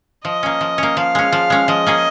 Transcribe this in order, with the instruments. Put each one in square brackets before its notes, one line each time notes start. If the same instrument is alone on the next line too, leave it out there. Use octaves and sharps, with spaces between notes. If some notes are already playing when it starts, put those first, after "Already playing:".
[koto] F3 [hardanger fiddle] D#5
[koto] A#3 C#4
F3
A#3 C#4
[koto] F3 [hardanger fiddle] F5
[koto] G#3 C#4
F3
G#3 C#4
[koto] F3 [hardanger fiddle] D#5
[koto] A#3 C#4 G#4